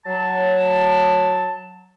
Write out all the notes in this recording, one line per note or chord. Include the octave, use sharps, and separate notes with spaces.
F#3 A5